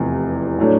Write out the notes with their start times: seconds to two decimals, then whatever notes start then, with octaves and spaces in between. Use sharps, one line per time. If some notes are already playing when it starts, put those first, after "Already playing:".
Already playing: F1 E2 C3
0.58 A2 F#3 A3 D4